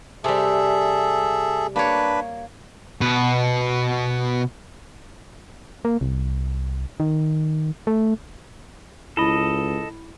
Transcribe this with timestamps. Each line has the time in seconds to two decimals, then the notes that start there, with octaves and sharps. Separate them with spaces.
0.24 C3 G3 G#4 A4 E5
1.76 A#3 D4 B4 C#5
3.01 B2 B4
5.85 A#3
6.01 C2
7.00 D#3
7.87 A3
9.17 C#2 E4 A4 D#5 B5